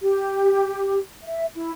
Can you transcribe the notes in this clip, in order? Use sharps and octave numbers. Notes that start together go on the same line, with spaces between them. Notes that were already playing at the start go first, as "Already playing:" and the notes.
G4
E5
E4